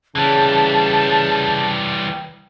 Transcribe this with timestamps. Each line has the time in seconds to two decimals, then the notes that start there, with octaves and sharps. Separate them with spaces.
0.16 C#3 E3 G3 A5